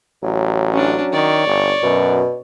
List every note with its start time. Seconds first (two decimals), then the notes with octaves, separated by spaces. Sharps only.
0.23 A1 F#3
0.73 C#4 D4
1.13 D#3 C#5 D5
1.47 G1
1.83 F#2 B2